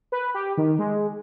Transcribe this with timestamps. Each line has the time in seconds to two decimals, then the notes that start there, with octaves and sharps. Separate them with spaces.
0.12 B4
0.35 G4
0.58 D#3
0.79 G#3